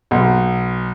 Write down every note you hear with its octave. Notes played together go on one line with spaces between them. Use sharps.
B1